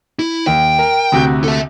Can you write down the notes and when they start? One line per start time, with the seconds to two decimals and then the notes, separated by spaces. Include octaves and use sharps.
0.19 E4
0.47 D#2 G5
0.79 A#4
1.12 D2 C3 F#4
1.44 A4 E5